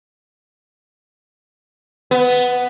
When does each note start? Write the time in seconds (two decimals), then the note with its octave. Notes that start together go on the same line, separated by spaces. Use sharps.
2.11 B3